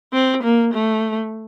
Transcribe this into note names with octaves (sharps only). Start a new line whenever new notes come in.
C4
A#3
A3